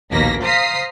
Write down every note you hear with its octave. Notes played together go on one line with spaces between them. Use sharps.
A#1 D#2 B2 A#3 A#6 B6
C5 F5 A#5 D#6 B6 C7